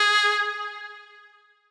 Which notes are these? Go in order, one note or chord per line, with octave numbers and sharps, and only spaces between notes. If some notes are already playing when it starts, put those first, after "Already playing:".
Already playing: G#4